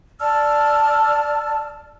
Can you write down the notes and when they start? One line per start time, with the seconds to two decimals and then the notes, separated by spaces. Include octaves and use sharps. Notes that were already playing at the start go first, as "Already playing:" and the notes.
0.20 D5 A5 E6 F6